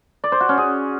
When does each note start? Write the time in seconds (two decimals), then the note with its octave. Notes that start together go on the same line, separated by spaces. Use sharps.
0.24 D5
0.32 C5
0.40 F#4
0.49 C#4
0.57 G#4